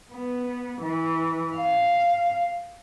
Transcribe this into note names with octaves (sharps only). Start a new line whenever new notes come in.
B3
E3
F5